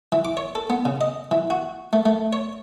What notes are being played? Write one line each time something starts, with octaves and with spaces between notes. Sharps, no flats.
E3
D6
C#5
A4
B3
C#3
D#5
E3
F#4
A3
A3
C#5